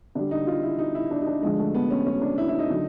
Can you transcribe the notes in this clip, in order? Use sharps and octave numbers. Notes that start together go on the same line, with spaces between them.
D3 G3 D4
D#4
F4
E4
D#4
E4
D4
D#4
D4
D3 F3 G#3
A3
B3
C#4
C#4
D4
E4
E4
D#4
D3 F#3